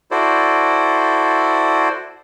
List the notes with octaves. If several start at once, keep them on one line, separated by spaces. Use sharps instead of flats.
E4 F#4 A4 C5 D5